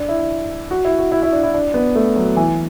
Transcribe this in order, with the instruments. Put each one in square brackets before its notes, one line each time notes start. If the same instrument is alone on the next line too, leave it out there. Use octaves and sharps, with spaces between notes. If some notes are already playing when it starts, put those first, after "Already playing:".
Already playing: [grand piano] D4
E4
F#4
E4
F#4
E4
E4
D4
E4
D4
B3
A3
F#3
E3